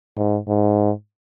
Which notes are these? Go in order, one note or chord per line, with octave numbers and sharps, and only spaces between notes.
G#2
G#2